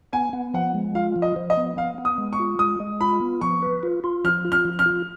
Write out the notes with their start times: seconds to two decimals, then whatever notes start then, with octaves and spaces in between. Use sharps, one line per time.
0.13 B3 G#5
0.33 B3
0.54 F3 F#5
0.75 G#3
0.95 F4 F5
1.16 F3
1.22 D#5
1.36 F3
1.50 D#5
1.57 B3
1.77 B3 F5
1.98 B3
2.05 D#6
2.18 G#3
2.33 C#6
2.39 F4
2.59 G#3 D#6
2.80 G#3
3.01 F4 B5
3.21 B3
3.41 F3 C#6
3.62 B4
3.83 F4
4.04 F4
4.24 F3 F6
4.45 F4
4.52 F6
4.65 F3
4.79 F6
4.86 F4